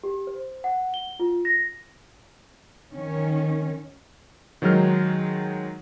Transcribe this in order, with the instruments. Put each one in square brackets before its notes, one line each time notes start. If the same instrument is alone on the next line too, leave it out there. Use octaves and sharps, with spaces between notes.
[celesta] G4
C5
F#5
G7
F4
A#6
[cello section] D#3 C#4
[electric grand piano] D#3 F#3 G#3 D#4 F6